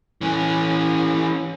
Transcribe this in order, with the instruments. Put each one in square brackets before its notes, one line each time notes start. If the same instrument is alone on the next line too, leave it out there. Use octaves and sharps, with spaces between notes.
[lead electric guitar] E3 C#4